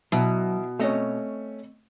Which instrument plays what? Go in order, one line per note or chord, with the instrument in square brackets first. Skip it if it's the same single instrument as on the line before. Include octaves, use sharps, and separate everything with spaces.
[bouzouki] B2 [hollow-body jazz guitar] F#3 [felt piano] E4
[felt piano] A3 C#4 [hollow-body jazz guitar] C4 C#5 D#5